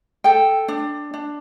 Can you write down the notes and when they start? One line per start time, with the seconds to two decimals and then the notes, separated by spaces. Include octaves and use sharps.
0.24 A4 G5
0.68 D4
1.14 D4